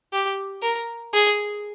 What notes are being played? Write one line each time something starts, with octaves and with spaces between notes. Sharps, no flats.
G4
A#4
G#4